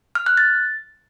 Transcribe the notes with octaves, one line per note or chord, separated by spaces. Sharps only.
F6
F#6
A6